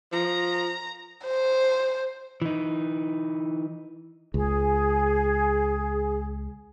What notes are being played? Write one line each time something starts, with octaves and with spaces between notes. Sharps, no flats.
F3 A#5
C5
E3 D#4
C#2 G#4